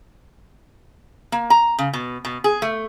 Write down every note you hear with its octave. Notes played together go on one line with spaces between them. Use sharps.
A#3
A#5
C#3
B2
B2
G#4
A3